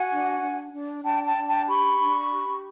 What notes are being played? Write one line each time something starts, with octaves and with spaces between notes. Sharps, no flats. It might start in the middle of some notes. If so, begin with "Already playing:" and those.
Already playing: F#4 F#5 G#5
D4
D4
D4
D4 G5 A5
G5 A5
D4
G5 A5
G4 B5 C#6
D4
G4